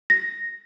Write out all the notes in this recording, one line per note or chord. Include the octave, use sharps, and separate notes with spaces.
A#6